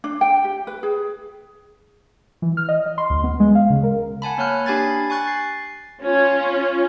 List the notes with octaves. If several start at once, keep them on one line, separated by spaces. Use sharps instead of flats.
D4
G5
G4
B4
G#4
E3
F6
D#5
D#5
C6
D2
B3
G#3
F5
C#3
A#4
F#5 G#5 A5 B5
A#3 C#5 F6 F#6
D4 G4 G#5 B5 G#6 A6
G#5 C#6 F#6 A6
C7
C#4 F4